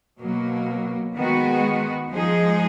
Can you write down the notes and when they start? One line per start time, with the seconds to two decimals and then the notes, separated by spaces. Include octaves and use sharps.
0.20 B2 F#3 A#3
1.15 D#3 G#3 B3 F#4
2.10 F3 G#3 D#4 G#4